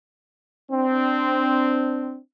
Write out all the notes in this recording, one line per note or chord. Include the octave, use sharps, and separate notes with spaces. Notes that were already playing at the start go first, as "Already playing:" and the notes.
C4 D4